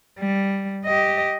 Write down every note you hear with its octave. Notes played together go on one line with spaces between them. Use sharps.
G3
G4 D#5